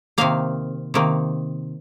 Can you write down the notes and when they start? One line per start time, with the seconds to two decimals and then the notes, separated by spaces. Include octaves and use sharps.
0.18 C3 D#3 A#3 F5
0.94 C3 D#3 A#3